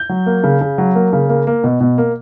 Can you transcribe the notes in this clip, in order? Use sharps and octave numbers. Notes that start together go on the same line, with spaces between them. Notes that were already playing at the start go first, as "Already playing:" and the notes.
Already playing: G6
F#3
A#3
C#3
C#3
F#3
A#3
C#3
A#3
A#3
B2
B2
A#3